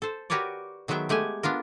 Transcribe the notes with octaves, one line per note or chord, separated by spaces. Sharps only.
A4 C5
F#4 G4 A#4 B4 C#5 D5
D#3 F#3 G#3 B3 E5 G5
G#3 A3 G4 F#5 G#5
B3 D4 F4 A#4